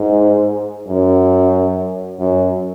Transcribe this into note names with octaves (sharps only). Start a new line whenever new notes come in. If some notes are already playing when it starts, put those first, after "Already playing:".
Already playing: G#2
F#2
F#2